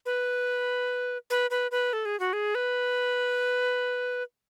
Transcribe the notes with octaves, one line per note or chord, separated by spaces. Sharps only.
B4
B4
B4
B4
A4
G#4
F#4
G#4
B4